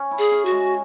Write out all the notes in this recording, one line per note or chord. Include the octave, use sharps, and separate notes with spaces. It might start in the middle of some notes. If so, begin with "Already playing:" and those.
Already playing: C#4
E4
G#4
C#4
F#4
G#3